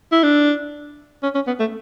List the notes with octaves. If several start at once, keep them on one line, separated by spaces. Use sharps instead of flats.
E4
D4
C#4
C#4
B3
A3